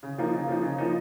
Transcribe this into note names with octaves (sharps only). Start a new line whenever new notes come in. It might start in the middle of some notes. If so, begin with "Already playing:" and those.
C#3
F3 A#3 D#4
C#3
F3 A#3 D#4
C#3
F3 A#3 D#4